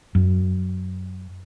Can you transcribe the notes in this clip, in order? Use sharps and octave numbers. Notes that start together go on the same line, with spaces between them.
F#2